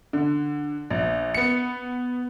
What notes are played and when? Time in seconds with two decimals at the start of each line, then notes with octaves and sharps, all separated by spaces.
0.13 D3
0.90 A#1
1.34 B3 C#7